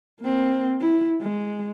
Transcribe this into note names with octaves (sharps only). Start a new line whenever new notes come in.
A#3 C4
E4
G#3